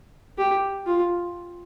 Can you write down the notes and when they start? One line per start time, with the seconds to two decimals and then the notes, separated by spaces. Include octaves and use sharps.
0.38 G4
0.86 F4